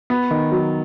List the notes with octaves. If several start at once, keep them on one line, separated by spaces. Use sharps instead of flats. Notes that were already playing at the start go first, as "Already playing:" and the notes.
B3
D#3
F#3